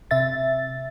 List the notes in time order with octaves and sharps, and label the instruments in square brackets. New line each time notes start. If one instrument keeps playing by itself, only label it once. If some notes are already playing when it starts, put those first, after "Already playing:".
[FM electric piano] C3 E5 A6